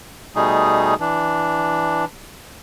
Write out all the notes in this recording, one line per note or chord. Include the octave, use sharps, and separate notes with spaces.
B2 G3 A3 D#4 G#4
E3 D4